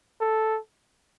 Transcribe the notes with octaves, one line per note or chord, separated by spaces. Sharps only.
A4